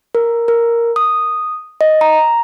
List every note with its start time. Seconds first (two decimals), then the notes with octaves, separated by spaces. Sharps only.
0.15 A#4
0.48 A#4
0.96 D#6
1.81 D#5
2.01 A#5